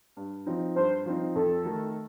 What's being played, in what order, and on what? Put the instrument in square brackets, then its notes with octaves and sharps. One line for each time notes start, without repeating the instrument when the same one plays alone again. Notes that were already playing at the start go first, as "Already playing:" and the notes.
[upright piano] G2
F3 C4 D#4
[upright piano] G2 [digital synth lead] C5
[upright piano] F3 C4 D#4
[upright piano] F2 [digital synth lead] A4
[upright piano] D#3 A3 D#4 A#4